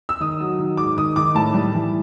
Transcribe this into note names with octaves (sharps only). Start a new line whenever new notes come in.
E6
D#3 D#6
F#3
D#3
G#2 D6
D#3 D#6
D#3 D6
A2 A5
G3
E3